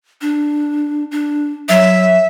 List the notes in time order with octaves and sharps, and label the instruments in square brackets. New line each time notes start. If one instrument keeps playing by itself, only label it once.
[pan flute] D4
D4
[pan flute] F#3 [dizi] E5